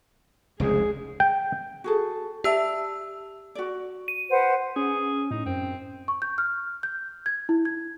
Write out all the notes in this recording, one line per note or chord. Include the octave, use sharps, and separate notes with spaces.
F1 C#2 G#2 G#4
G5
F#4 G#4 A4
G4 D5 E5 A5 E6
F#4 D5
D#7
B4 C5 F#5
C#4 G#4
A2 D#4
F#2 C4
C#6
G6
F6
G6
G#6
E4
G#6